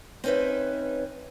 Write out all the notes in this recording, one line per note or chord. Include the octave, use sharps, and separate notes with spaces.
C4 C#4 D#4 B4 E5